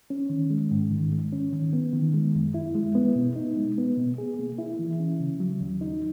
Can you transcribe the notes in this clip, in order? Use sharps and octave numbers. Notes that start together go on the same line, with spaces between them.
C#4
D#3
G#3
G#2
D#3
G#3
C#4
D#3
B3
D#3
G#3
F#2
E4
G#3
B3
B2
D#4
G#3
B3
B2
G#4
A#3
E4
E3
C#4
C#3
F#3
D#2
D#4